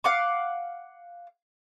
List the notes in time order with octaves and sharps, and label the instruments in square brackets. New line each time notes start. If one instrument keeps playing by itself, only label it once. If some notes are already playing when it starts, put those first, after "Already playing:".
[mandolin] F5 F#5 D6